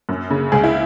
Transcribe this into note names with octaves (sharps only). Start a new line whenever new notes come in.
F#2
C#3
C#2 G#4
E4